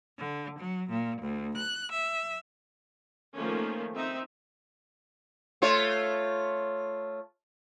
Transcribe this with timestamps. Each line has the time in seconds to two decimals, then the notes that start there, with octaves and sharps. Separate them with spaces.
0.18 D3
0.58 F#3
0.89 A#2
1.20 D2
1.57 F#6
1.91 E5
3.35 D#3 F3 A3 A#3 C#4
3.95 C4 D#4 E5
5.62 A3 F4 C#5